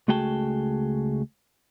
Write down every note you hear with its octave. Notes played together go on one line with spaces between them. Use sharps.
C#2 A3 F#4 G#4 G5 A5